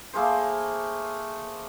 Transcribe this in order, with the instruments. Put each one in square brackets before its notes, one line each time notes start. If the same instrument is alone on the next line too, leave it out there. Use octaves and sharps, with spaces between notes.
[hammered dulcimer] A3 A#3 G#4 C5